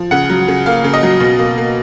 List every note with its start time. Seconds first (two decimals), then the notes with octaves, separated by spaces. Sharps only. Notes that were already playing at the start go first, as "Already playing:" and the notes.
Already playing: F3
0.11 C#3 F#5
0.30 F#3
0.48 C#3
0.66 A#3 F5
0.84 C#3
0.94 D#5
1.03 F#3
1.20 B2
1.39 A#3
1.58 A#3